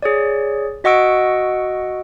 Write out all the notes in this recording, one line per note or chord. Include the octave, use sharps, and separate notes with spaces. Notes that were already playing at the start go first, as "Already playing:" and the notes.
G#4 C#5 D5
F#4 D#5 F#5 C#6 E6 D7